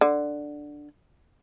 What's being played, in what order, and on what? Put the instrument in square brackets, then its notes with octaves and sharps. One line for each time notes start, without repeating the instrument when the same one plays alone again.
[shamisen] D3